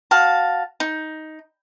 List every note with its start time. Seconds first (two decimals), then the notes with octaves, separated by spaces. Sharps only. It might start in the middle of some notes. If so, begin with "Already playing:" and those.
0.11 F#4 F5 A5
0.80 D#4